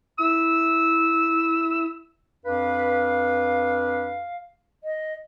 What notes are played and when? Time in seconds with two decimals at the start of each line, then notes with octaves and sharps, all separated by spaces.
0.19 E4 E6
2.45 F2 D4 B4 F5
4.84 D#5